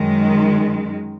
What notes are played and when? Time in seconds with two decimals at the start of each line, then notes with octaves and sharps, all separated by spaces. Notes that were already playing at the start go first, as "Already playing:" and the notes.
Already playing: F#2 D#3 G#3